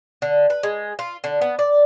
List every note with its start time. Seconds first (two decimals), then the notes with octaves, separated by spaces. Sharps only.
0.22 D3
0.50 B4
0.63 G#3
0.99 F4
1.24 D3
1.42 B3
1.59 D5